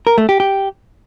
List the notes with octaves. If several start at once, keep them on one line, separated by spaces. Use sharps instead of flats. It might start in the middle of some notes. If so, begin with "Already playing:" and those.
A#4
A3
G4
G4